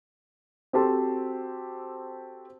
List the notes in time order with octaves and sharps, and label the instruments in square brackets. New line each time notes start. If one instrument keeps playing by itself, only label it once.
[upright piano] C4 F#4 G4 A4 A5 C6